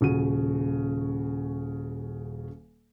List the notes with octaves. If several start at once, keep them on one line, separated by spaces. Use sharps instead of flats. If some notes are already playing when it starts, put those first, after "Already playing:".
D#1 C#3 F#4 D#7